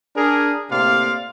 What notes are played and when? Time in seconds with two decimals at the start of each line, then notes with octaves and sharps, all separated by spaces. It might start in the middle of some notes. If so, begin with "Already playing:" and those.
0.16 D4 G#4 A#4
0.70 A2 C3 A#3 D5 F5 C6